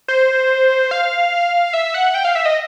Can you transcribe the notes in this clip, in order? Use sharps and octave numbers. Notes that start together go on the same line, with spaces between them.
C5
F5
E5
F#5
G5
F5
E5
D#5